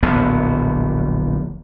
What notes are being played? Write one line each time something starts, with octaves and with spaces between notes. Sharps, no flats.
D1 A#1 A2 B3